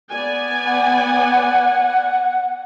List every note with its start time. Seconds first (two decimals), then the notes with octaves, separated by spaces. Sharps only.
0.12 B3 D5 G#5
0.66 F#5